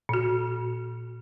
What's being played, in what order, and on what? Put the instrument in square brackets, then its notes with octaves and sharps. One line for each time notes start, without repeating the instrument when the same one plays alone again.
[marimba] A#2 F#4